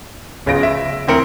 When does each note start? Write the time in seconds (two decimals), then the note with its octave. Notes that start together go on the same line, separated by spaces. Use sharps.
0.46 D1 C#3 B3 F4 A#6 D7
0.63 E5
1.07 D2 E3 C4 A#4 C#7